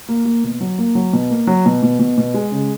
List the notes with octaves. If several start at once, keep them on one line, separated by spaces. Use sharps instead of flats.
A#3
A#3
B2
F#3
A#3
F#3
B2
A#3
F#3
B2
B2
B2
B2
G#3
C#3